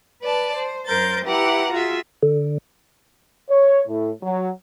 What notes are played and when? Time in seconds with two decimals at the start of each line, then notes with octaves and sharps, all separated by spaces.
0.22 B4 D5 A5
0.56 C5
0.86 F#2 A#4 C5 G6 A6
1.26 E4 G4 B4 F#5 A#5
1.72 F4 F#4 G#4 E5
2.23 D3
3.49 C#5
3.88 A2
4.22 F#3